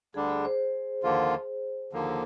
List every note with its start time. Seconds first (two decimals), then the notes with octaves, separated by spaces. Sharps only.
0.14 D2 D3 G3 D4 G#4
0.29 G#4
0.45 C5
1.03 D#2 D3 F3 A#3 F4
1.92 D#2 D3 F3 A#3